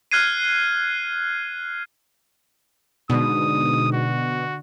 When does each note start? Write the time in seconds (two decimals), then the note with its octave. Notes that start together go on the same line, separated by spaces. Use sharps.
0.11 F6 F#6 G#6 C7 D#7
3.10 G#2 B2 D3 D#6
3.92 F#4